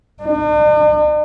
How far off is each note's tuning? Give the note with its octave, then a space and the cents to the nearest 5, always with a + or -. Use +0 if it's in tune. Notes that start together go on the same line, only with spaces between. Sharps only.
D4 +45